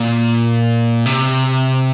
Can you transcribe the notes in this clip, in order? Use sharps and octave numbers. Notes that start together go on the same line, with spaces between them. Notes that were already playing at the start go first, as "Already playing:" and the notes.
Already playing: A#2
C3